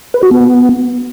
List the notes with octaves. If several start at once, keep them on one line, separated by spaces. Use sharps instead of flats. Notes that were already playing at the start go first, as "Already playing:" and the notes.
B4
F#4
B3